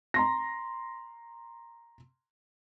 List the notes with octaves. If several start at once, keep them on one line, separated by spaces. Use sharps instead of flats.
A#5 C6 A#6